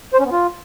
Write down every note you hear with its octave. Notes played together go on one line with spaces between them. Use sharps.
C5
C#4
B3
F4